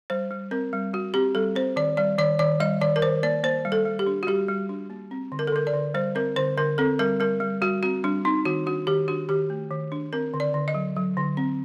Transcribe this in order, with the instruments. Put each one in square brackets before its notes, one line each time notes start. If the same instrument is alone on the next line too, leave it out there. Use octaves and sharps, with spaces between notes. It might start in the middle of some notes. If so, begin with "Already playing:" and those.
[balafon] G3 C5
G3
C4 A#4
G3
G3 F#4
C4 G4
G3 A4
C4 C5
D#3 D5
G3 D5
D#3 D5
D#3 D5
G3 D#5
D#3 D5
A#4
D#3 C5
A#3 D5
A#3 C5
G3
A4
G3
G4
D4
F#4
G3 G4
G3
D4
A#3
C4
D3
A#4
A4
D3 A#4
D5
D3
G3 C5
C4 A#4
D3 C5
D3 A#4
C4 A4
G3 A#4
G3 A#4
G3
G3 F#4
C4 F#4
G3 D4
C4 D#4
D#3 F#4
D4 F#4
D#3 G4
D4 F#4
D#3 G4
A3
D#3
D4
C4 A#4
D3
D5
D3
D#5
F#3
F#3
D3
C4